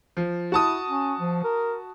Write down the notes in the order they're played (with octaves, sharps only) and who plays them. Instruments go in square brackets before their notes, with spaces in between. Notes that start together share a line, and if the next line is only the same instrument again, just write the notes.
[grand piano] F3
[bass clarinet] E4 [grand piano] F#4 A5 D#6
[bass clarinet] C#4
F3
A#4